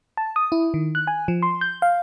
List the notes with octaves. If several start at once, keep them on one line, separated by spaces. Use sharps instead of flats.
A5
D#6
E4
D#3
F#6
G#5
F3
C6
G6
F5